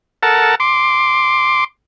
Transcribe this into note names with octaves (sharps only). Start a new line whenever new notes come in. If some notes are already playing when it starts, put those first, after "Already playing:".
A4 A#4 F#5 A5
C6 D6